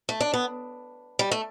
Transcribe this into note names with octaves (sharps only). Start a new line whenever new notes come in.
A3
D4
B3
G3
A3